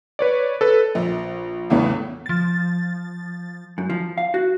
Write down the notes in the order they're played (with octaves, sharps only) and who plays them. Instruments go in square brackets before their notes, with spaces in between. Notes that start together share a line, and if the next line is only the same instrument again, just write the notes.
[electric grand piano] B4 C#5 D5
A4 B4
[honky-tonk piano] A#1
E2 A2 C#3 E3 B3 C#4
[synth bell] F3 A6
[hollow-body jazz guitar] F#2
F3
F5
F#4